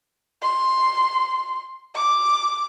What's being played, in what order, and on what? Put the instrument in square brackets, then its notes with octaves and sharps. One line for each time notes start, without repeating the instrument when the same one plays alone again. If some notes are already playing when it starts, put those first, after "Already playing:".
[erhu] C6
D6